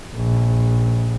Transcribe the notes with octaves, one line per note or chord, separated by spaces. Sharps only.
A#1